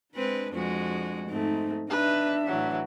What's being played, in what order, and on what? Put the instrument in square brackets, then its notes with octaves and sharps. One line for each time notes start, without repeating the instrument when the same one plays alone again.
[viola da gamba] G#3 C4 B4 [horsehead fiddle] D4
[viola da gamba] F2 G#3 F#4
[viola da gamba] G#2 C4 [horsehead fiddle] A3 D#4
[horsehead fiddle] D4 E5 [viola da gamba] D#4 [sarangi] B4
[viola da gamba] A2 E3 [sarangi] F#3